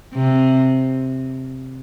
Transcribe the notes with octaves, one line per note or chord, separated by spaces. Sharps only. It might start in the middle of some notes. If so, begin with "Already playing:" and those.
C3